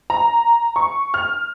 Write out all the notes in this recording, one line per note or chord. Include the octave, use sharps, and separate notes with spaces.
A#5
C#6
F6